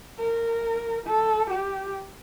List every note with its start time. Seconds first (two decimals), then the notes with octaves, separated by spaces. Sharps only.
0.19 A#4
1.07 A4
1.50 G4